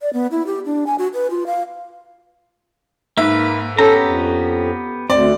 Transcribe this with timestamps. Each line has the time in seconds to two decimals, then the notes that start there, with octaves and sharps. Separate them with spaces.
0.01 D5
0.13 B3
0.31 E4
0.46 G4
0.65 D4
0.86 G#5
0.98 F#4
1.14 B4
1.30 F4
1.46 F5
3.17 G#2 A#3 B4 E5
3.79 B3 C#4 G4 A4 A#5
4.04 F2
5.10 D2 C4 D5